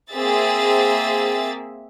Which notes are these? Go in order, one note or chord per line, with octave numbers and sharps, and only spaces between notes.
A#3 C4 G#4 E5 A6